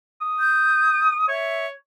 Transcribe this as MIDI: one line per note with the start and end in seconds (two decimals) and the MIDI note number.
0.21 1.25 87
0.40 1.09 91
1.29 1.71 73
1.29 1.66 76